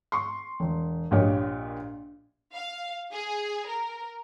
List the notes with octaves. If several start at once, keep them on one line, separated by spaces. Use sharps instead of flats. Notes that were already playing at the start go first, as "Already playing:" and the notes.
C6 C#6
E1
A#1 A#2 G4 C#5 D#5
F5
G#4
A#4